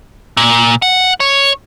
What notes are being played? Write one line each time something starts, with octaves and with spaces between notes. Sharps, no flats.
A#2
F#5
C#5